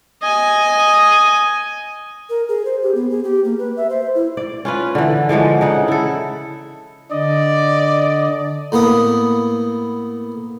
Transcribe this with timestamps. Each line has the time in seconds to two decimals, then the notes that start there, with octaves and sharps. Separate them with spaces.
0.22 D#5 G#5
2.30 A#4
2.49 G#4
2.65 C5
2.82 G4
2.95 B3
3.11 G#4
3.24 G4
3.44 A#3
3.59 B4
3.77 E5
3.90 C5
4.15 E4
4.37 D5
4.65 C#4 F4 B4
4.95 D3 E3
5.29 D3 E3 F3 G#3
5.61 C#3 D#4 F#5
5.88 E4 A4
7.12 D3 D5 D#5
8.72 A2 A#3 B3 D#6